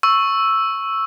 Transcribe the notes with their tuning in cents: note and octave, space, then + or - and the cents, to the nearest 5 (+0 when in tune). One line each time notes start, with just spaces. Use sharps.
C#6 -5 E6 +0